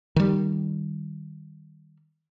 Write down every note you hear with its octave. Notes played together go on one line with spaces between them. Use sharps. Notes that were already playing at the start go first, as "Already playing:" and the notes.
D#3 G3